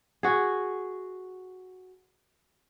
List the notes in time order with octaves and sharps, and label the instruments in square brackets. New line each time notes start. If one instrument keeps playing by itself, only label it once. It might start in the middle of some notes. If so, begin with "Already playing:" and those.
[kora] F#4 G#4